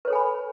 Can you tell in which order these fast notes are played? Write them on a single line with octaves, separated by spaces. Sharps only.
B4 C#5 A4 G#5 B5